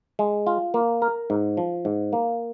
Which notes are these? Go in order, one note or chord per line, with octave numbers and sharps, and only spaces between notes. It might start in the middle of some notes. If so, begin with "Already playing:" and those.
G#3
F4
A#3
A#4
G#2
F3
G#2
A#3